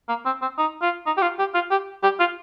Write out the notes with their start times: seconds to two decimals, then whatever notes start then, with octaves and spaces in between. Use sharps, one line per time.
0.09 A#3
0.26 C4
0.42 C4
0.58 D#4
0.82 F4
1.07 D#4
1.17 G4
1.22 F4
1.39 G4
1.55 F4
1.71 G4
2.03 G4
2.20 F4